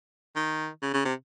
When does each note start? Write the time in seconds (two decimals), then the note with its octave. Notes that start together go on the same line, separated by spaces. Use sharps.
0.36 D#3
0.82 C#3
0.94 C#3
1.05 C3